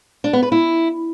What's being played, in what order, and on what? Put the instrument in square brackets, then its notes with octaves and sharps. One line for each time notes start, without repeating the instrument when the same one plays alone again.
[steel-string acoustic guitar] D4
B3
B4
E4